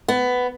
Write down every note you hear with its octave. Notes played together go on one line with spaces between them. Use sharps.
B3